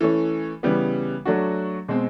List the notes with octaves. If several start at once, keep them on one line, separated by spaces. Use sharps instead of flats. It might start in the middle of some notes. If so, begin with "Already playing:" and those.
E3 A3 C#4
C#3 E3 G3 B3
F#3 A3 D4 F#4
B2 G#3 C4